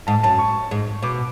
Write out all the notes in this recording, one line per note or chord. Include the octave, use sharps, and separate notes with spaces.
G#2 A5
F#2 A5
C#6
G#2
B2 D6